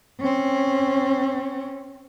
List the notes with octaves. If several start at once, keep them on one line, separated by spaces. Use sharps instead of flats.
C4 C#4